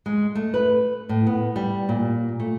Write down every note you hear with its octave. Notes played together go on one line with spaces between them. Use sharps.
G#3
A3
B4
A2
B3
G3
A#2
A3